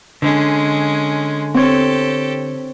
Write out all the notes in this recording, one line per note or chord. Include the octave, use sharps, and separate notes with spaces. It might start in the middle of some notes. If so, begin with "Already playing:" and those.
D3 G#3 C#4
C4 G4 A4 C#5